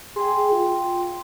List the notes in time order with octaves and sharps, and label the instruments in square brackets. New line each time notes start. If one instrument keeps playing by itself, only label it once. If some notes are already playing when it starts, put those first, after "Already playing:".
[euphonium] G#4 [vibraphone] G5 C6
[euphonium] F4